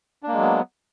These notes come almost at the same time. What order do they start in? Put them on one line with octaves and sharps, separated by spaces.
D4 A#3 G#3 F#3 B3